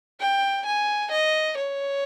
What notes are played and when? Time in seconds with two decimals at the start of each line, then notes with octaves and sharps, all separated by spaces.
0.20 G5
0.66 G#5
1.12 D#5
1.58 C#5